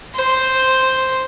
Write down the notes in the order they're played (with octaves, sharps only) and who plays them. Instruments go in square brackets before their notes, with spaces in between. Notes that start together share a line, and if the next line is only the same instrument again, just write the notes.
[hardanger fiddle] C5